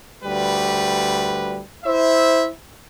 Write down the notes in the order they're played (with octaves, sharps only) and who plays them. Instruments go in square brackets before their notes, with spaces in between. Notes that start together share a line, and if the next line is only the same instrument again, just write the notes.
[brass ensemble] D2 G3 B4
E4 C5 E5